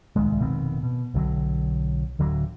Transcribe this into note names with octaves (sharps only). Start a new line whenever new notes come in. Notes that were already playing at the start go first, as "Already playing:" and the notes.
D1 C2 D#3 G#3
F1 B2 D#3 C4
B2
B1 D3 D#3 F#3
D1 D3 F#3